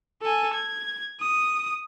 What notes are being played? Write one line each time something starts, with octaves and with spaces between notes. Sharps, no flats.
A4 G#5
G#6
D#6